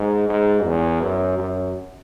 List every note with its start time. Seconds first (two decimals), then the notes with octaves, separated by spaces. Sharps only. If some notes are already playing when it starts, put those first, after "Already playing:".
Already playing: G#2
0.29 G#2
0.65 E2
1.02 F#2
1.38 F#2